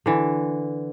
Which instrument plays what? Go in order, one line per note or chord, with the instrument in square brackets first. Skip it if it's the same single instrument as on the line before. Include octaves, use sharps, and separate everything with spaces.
[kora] D3 E3